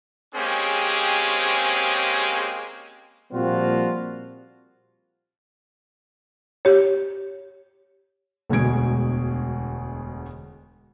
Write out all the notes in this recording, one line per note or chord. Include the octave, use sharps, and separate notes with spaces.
G#3 A#3 C4 C#4 G4 G#4
A#2 F3 G3 C4 F4 F#4
G4 C#5
E1 D2 B2 G#3 G#6 D7